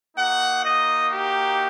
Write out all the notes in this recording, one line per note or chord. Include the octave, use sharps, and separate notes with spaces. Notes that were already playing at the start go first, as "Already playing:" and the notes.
A#3 D#4 F#4 F#5
D#5
G4